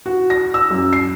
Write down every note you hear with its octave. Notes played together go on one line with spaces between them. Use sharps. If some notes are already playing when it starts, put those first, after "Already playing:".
F#4
A#6
E6
F#2
C7